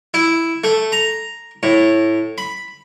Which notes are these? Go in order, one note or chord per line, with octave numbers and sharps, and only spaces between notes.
E4
A3
A#5
A2
B5